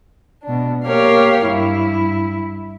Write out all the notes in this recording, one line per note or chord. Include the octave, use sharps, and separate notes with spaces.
B2 D4
A#3 G4 A#4 C#5 F5
G2 E4